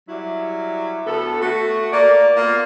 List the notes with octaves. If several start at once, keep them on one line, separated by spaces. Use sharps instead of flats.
F#3 G3 E4
D2 B3 A4
A3 F#4
A#3 A#4 D5
A#3 B3 F4